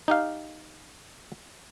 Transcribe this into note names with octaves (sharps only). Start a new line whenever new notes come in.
D#4 G4 F5